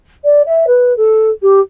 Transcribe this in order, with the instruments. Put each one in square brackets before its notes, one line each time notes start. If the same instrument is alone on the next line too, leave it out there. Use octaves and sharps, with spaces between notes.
[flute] D5
E5
B4
A4
G4